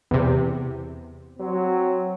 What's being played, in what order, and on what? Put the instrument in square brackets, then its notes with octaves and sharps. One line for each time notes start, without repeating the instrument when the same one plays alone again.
[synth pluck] E2 C3
[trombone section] F#3 C4